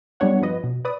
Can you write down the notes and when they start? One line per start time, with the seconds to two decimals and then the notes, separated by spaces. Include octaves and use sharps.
0.20 F#3 G3 B3 D4 C#5 F#5
0.41 G2 F3 B4 D#5
0.64 B2
0.85 B4 D5 D#6